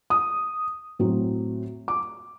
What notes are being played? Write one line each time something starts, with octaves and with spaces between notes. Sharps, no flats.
D#6
A2 F#3 C4
D6